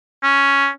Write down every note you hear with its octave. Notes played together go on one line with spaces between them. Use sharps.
C#4